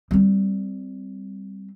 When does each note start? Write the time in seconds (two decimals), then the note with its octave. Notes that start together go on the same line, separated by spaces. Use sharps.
0.11 G3 C4